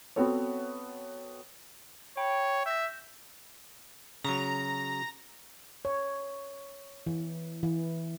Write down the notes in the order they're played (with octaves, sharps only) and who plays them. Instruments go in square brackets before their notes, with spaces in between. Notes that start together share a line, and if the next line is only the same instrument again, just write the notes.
[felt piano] B3 C4 F#4 A4 C#5
[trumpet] C#5 [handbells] G5 B5
[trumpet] E5 [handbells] G6 A#6
[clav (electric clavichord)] C#3 F#3 [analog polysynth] A#5
[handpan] C#5
E3
E3